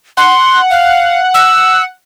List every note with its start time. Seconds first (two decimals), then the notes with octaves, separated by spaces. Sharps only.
0.17 F#5 C6
0.70 F5
1.34 E6